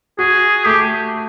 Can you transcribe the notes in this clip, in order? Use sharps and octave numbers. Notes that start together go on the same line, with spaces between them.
F#4 G#4
A3 G4